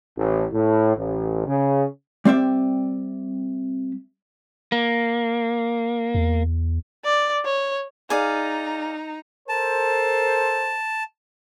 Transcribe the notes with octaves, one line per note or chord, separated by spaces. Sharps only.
A1
A2
A1
C#3
G3 C4 D5 E5
A#3
E2
D5
C#5
D#4 G#4 D5 F5 A#5
A4 A#4 C5 A5